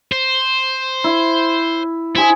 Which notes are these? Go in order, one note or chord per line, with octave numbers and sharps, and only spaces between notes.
C5
E4
E4 G#4 C5